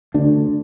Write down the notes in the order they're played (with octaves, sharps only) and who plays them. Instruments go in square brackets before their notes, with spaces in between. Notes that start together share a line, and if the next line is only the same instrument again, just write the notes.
[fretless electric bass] D2 D3 D4